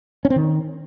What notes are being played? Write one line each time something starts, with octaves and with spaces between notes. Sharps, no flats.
C#4
C4
D#3